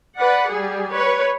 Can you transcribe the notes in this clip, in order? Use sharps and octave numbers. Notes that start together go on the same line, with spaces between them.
B4 D5 F#5
G3 G#4
B4 C#5